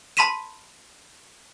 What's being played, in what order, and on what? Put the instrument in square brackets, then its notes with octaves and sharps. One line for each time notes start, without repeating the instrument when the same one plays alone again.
[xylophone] A5 B5 C6 B6 D#7 E7